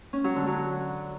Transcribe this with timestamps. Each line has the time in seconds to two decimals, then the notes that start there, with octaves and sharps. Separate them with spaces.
0.13 C#4
0.24 F#3
0.36 D3
0.47 F#3